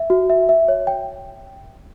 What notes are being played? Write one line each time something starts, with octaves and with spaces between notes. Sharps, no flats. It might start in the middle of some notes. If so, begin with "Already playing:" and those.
Already playing: E5
F#4
E5
E5
C#5
G5